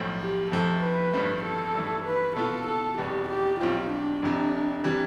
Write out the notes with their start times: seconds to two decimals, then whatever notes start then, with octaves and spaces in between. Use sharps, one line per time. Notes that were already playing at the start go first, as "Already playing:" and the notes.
Already playing: B1 A2 F3
0.21 G4
0.51 F2 C3 F3 A3 A4
0.83 B4
1.13 A1 G2 D3 F3 A3
1.44 A4
1.75 G2 E3 A3
2.06 B4
2.36 B2 B3 F4 A4
2.68 A4
2.98 F1 E2 B2 G3 B3 G4
3.30 G4
3.61 B1 B2 G3 C4 F4 G4
3.91 D4
4.22 F1 F2 C3
4.84 C3 E3 G3